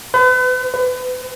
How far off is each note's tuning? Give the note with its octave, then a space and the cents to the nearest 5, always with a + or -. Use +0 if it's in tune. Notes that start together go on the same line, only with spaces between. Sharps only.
B4 +40
B4 +35